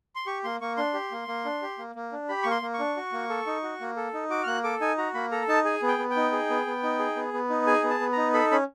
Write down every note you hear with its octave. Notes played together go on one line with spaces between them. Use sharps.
C6
G4 C#6
A#3 C6
A#3 C#6
D4 C6
G4
A#3
A#3
D4
G4
A#3
A#3
D4
G4 B5
A#3 C#6
C6
A#3
C#6
D4
F#4
A#3
A4
D#4
F#4
A#3
A4
D#4
F#4 D6
F6
A#3 F#6
A4 D6
D#4 G#5
F#4 A#5
A#3 B5
A4 A#5
D#4 A5
G#4 G#5
B3
G5
B3
G5
D#4
G#4
B3
B3
D#4
G#4
B3
B3
D#4
G#4 G#5
B3
A5
B3
D#4 A#5
A4 B5
C#4 B5